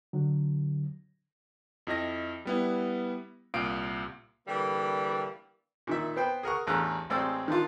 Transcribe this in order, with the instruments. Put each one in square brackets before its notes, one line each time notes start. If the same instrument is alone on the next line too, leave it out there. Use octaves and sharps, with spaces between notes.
[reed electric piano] D3 F#3
[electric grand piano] F2 E4 D#5 A#6
G3 B3 E4
C2 A#2 F5 D#6 D7
[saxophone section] D3 E3 G3 A#3
[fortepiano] A#2 D#3 E5
B3 C5 G5 B5
G#4 A#4 F#5 C#6
A1 E2 D4 G#4 A#5 F#6
A1 G#3 C4 D5 E6
D#3 F3 D4 F4